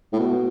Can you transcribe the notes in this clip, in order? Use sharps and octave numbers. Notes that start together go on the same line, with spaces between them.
A2
B2